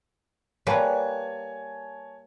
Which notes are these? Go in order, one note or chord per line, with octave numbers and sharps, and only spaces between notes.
G3 A#3 B4 C#5 G#5 A5